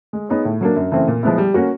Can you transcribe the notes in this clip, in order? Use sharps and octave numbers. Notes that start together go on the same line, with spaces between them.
G#3
B3 D#4 G#4 C#5
A2
F#3 A#3 D4
F#2
C#3 E3 A3 C4
A#2
F3 G#3 B3 E4
G3
A#3 C#4 F#4 A#4